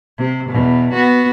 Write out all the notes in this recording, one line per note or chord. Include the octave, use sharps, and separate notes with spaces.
C3
E2 B2
B3 F#4